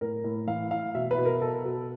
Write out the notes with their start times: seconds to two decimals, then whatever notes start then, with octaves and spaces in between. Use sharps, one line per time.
0.01 A2 A#4
0.24 A2
0.47 E3 F5
0.71 E3 F5
0.95 B2 E5
1.11 B4
1.18 B2
1.25 A#4
1.41 B2 A4
1.65 B2